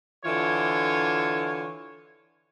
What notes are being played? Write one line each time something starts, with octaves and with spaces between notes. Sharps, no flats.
D3 E3 F4 C#5